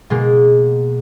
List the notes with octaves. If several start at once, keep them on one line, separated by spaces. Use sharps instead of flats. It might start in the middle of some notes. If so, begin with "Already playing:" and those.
B2 G#3 A#3